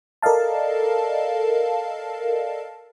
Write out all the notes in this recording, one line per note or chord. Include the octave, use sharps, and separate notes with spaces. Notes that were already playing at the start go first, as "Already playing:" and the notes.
A4 A#4 D5 D#5 F5 A5